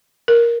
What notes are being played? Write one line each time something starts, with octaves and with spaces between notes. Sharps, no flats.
A#4